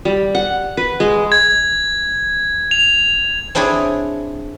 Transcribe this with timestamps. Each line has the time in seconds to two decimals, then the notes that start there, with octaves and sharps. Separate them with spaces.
0.05 G3
0.35 F#5
0.77 B4
1.00 G#3
1.32 G#6
2.71 F7
3.55 C4 D4 E4 G#4 C#5